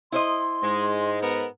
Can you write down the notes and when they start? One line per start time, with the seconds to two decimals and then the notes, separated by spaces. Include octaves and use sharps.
0.12 E4 C5 D#5 C6
0.63 G#2 G#3
1.21 B3 A#4